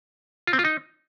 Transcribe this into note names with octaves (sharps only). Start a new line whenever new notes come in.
F4
C4
F4
D#4